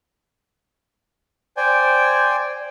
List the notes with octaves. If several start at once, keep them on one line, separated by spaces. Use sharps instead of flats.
C5 D5 G5 G#5